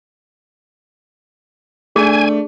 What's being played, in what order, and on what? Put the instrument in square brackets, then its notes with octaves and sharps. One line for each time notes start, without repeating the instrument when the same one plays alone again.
[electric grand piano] A3 [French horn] D4 [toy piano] G#4 [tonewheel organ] G#5